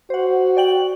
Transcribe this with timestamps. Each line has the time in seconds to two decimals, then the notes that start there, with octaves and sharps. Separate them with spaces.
0.10 F#4 C5 F#5
0.57 D5 G5 F#7